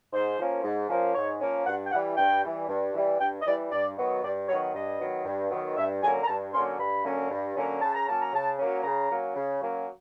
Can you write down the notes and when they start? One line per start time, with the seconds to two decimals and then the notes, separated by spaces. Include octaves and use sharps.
0.12 G#2 C5
0.38 F3 A#3 C#4
0.64 G#2
0.89 F3 A#3 C#4
1.14 G#2 C#5
1.40 F3 A#3 C#4
1.66 G2 F#5
1.86 G5
1.91 E3 G3 F#5
2.17 G2 G5
2.43 E3 G3
2.68 G2
2.94 E3 G3
3.19 G2 G5
3.41 D#5
3.45 E3 G3 D5
3.71 G2 D5
3.97 D#3 F#3 B3
4.22 G2 D5
4.48 D#3 F#3 B3 C#5
4.73 G2 D#5
4.99 D#3 F#3 B3
5.25 G2
5.50 D#3 F#3 B3
5.76 G2 E5
6.02 D3 F#3 A#3 C#4 G#5
6.23 A#5
6.27 G2 A5
6.53 D3 F#3 A#3 C#4 C6
6.79 G2 B5
7.05 D3 F#3 A#3 C#4
7.30 G2
7.55 D3 F#3 A#3 C#4
7.82 C#3 A5
7.94 A#5
8.08 F#3 A#3 C#4 A5
8.22 A#5
8.33 C#3 A5
8.59 F#3 A#3 C#4
8.83 C#3 A#5
9.09 F#3 A#3 C#4
9.35 C#3
9.61 F#3 A#3 C#4